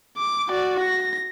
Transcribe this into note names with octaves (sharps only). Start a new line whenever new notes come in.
D6
F#4 D5
A#6